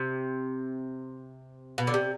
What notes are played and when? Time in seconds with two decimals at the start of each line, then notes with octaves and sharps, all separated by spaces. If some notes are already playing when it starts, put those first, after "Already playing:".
Already playing: C3
1.78 B2
1.87 D3
1.94 C3